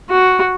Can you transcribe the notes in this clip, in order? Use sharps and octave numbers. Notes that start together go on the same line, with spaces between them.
F#4